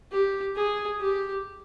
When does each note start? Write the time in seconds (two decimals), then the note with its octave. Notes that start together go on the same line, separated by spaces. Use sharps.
0.12 G4
0.56 G#4
1.00 G4